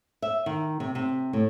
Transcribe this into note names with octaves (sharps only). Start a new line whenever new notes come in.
E5
D#3
C3
C3
A2